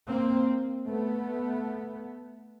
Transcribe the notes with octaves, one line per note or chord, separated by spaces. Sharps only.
A#3 C4
A3 B3